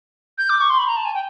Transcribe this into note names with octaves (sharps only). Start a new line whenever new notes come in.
G6
D6
C#6
C6
B5
A#5
A5
G#5
G5